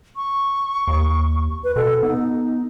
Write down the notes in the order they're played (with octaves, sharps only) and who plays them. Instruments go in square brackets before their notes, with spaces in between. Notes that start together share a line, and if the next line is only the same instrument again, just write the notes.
[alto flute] C#6
[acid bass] D#2
[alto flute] B4
[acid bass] B2 [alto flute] A4
[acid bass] B3 [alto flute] D#4